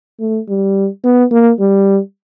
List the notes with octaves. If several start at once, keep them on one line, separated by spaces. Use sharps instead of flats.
A3
G3
B3
A#3
G3